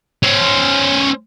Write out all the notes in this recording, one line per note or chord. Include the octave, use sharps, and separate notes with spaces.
C#4 C5